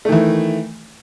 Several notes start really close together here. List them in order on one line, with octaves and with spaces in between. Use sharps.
A3 D#3 E3